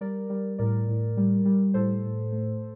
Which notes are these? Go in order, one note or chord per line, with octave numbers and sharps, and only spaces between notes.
G3 A#4 D5
G3
A2 A#4 D5
A2
G3
G3
A2 A4 C5
A2
A3